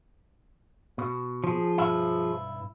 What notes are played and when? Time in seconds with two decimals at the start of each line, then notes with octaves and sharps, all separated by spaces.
0.98 B2
1.44 F3 G#4
1.78 B1 G2 E4